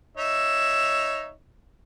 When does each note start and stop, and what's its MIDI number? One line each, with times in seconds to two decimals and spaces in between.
0.17 1.31 63
0.17 1.31 73
0.17 1.31 76